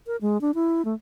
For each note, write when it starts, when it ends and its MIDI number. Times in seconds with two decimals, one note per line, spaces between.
0.07 0.16 70
0.21 0.40 56
0.41 0.51 62
0.55 0.85 64
0.85 0.94 57